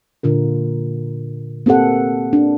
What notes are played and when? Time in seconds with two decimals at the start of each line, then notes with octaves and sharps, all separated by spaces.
0.23 A#2 D3 F4 A#4
1.66 A#3 C4 G4 A4 F#5
2.33 D4